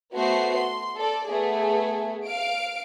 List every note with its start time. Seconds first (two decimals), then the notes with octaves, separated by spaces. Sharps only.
0.14 A3 B3 F#4 C5 C7
0.58 C6
0.98 A4 D5
1.29 A3 B3 G#4
2.25 F5 D7